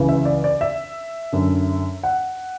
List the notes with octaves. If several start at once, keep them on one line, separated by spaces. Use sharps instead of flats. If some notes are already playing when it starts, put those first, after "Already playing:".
Already playing: C#2 C#3 E3
E5
D5
D5
E5
F#2 D3
F#5